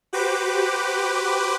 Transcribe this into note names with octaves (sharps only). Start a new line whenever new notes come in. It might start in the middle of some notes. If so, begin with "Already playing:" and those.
F#4 G4 B4 C5 D6